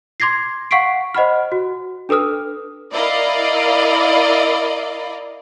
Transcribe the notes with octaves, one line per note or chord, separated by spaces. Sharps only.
C6 D6 G#6 A#6 C7
F5 F#5 C#6 B6 C7 D7
C5 D#5 F#5 B5 F6
F#4
D4 A4 B4 D#6 F6
E4 A#4 D5 D#5 F5